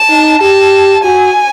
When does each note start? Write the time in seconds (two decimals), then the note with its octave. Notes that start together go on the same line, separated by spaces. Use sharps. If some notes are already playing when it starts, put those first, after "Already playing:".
Already playing: A5
0.09 D#4
0.41 G4 A5
1.03 F#4 G#5